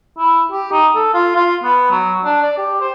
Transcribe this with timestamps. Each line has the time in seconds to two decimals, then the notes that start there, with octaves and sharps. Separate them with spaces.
0.18 E4
0.52 G4
0.72 D#4
0.95 A4
1.14 F4
1.36 F4
1.64 B3
1.91 F#3
2.24 D4
2.42 D5
2.58 G4
2.80 C5